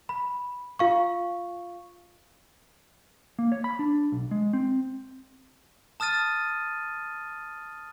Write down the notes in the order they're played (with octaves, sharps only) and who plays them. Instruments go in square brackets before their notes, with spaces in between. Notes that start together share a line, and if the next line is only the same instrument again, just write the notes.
[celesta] B5
F4 F5 C#6
[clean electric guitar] A#3
C#5
B5
D4
B1
G#3
C4
[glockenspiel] A5 D#6 F6 A6 D#7